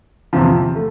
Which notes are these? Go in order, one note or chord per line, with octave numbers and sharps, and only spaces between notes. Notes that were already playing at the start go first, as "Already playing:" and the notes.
E2 C3 F3
A3